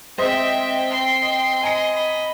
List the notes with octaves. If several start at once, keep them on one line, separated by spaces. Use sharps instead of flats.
G#3 C4 C5 D#5 E5 G5
C6
D#5
D#5 G#5 A#5 C#7
B5